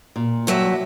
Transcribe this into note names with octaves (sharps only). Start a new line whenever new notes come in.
A#2
G2 F#3 E5